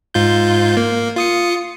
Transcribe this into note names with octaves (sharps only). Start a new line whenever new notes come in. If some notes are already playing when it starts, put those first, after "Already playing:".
G#2 F4 G6
A#3
F4 D#6 C#7